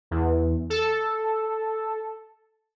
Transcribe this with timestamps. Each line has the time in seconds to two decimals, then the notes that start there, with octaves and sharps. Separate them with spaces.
0.11 E2
0.70 A4